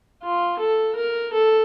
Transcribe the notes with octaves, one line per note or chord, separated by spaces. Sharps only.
F4
A4
A#4
A4